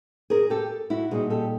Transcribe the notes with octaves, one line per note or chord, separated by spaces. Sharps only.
G#4 A#4
G4 A4
E4 F#4
A#2 G3 C4 D#4 F#4 G#4
G4 A4